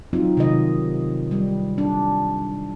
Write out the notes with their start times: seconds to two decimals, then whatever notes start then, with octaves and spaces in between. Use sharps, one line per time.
0.13 F#3 C4 D#4 F4
0.37 C3 D#3 D#5
1.31 G3
1.78 D4